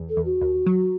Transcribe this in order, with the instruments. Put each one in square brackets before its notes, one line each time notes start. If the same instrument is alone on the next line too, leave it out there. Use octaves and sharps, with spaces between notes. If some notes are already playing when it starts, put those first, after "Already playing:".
Already playing: [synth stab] E2
[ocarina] A4
[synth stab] E2
[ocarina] F#4
[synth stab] D#2
F#3